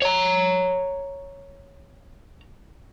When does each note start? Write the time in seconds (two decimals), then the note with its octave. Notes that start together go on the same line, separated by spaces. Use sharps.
0.02 C#5 A#5